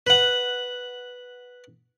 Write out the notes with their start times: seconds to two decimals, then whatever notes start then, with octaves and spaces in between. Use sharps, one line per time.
0.07 B4 F#5